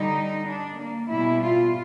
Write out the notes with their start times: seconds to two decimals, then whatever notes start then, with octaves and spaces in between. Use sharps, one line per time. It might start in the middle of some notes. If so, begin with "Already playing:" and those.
Already playing: D3 G3 D#4
0.47 D4
0.79 A#3
1.10 B2 G3 E4
1.42 F4